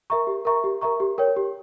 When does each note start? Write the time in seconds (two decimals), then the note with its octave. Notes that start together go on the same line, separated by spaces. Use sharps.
0.10 A#4 E5 A#5 C#6
0.27 G4
0.45 A#4 E5 A#5 C#6
0.64 G4
0.81 A#4 E5 A#5 C#6
1.00 G4
1.18 A#4 C#5 G5
1.37 G4